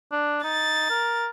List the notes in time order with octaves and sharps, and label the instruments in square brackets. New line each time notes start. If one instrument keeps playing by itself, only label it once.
[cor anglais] D4
[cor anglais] D#4 [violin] A6
[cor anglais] A#4